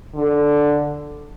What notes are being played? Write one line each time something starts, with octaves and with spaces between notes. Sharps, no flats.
D3